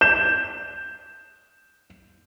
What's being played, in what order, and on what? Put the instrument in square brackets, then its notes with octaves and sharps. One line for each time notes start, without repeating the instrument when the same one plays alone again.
[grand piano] G6 E7